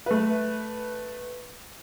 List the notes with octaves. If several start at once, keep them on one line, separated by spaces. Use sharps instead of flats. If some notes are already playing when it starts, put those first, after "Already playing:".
A3 B4